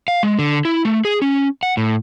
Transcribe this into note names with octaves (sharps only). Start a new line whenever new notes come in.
F5
G#3
D3
E4
A3
G#4
C#4
F#5
A2